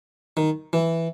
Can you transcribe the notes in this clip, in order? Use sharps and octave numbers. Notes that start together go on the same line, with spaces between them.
D#3
E3